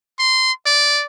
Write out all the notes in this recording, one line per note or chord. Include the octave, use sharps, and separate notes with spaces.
C6
D5